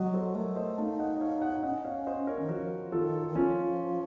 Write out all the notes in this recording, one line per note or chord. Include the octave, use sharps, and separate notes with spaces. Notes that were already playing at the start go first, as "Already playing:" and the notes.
Already playing: F#3 D#5 F#5
A4 C5
A3 A#4 C#5
C5 D#5
D#4 F5 A5
D#5 F#5
D#5
C#5 F5
D#5 F#5
C#4 D#5 F#5
C#5 F5
C5 D#5
A#4 C#5
D#3
F3 F#4 A#4
D#3 F4 A4
D#3
F3 C#4 F4